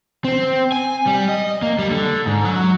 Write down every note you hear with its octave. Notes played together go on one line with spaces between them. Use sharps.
C4
G#5
G3
D#5
A#3
G3
D3
G#2
F#3